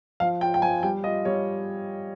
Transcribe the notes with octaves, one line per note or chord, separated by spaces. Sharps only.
F3 F5
F4 G5
G5
F3 G#5
G3 G5
F4 D#5
G3 C#5